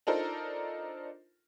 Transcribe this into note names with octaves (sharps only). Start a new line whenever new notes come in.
D4 D#4 F4 A4 A#4 C5